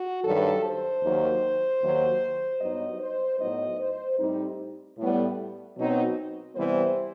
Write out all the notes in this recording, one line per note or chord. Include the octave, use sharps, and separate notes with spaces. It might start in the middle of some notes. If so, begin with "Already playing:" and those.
Already playing: F#4
G2 D#3 F#3 A4
C5
D#2 D#3 F#3
D#2 D#3 F#3
G2 F#3 B3 D#4 D#5
C5
A2 F#3 B3 D#4 D#5
C5
A2 G3 C4 D#4
A2 G3 B3
B2 F#3 C4 D#4
C3 E3 G3 B3 C5